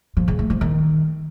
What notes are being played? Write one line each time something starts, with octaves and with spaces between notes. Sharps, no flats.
F3
C#3
A3
F3
D#3